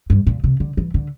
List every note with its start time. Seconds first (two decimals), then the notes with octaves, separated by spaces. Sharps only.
0.10 G2
0.27 A#2
0.44 C3
0.60 D3
0.77 E3
0.94 D3